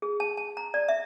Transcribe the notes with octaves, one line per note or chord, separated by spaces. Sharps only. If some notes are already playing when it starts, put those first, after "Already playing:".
G#4
A5
A5
A#5
D5
E5